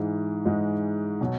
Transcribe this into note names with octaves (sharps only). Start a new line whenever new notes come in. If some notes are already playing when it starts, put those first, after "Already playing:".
Already playing: G#2 E3 G#3
G#2 E3 G#3
B2 F#3